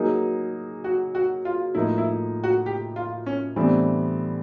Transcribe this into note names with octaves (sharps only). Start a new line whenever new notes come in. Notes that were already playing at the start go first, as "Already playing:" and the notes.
Already playing: F#3 A#3 D#4 G#4
F#4
F#4
F4
A2 F3 A#3 D#4 E4
E4
F#4
G4
F4
C#4
A2 E3 G3 B3 C4 D4